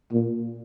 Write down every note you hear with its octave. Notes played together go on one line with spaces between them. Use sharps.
A#2